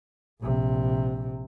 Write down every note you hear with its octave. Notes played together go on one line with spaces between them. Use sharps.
A#1 C3